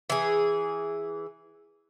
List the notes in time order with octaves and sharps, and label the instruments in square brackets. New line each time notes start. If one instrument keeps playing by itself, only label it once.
[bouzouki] E3 G#4